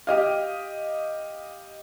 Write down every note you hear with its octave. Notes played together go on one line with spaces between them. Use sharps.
G4 D#5 F5